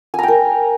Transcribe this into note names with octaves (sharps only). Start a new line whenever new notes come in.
A#4 G5 G#5 A#5